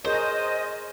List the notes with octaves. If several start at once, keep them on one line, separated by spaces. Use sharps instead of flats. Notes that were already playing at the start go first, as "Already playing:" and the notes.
G#4 A#4 C5 C#5 D#5